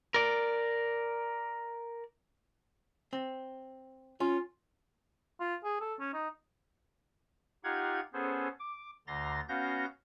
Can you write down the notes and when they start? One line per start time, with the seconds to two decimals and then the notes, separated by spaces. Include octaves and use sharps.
0.14 A#4 D5
3.13 C4
4.20 C#4 F4
5.40 F4
5.64 G#4
5.81 A4
6.00 C#4
6.14 D#4
7.64 D#4 F4 G4 F5 F#5 G#6
8.13 B3 C#4 G#4 A4 C5
8.60 D6
9.07 D2 D3 A#5 C6 A6 A#6
9.49 B3 C#4 F#4 F5 G6 A#6